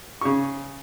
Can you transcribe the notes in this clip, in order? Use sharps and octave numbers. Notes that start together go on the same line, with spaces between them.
C#3 C#6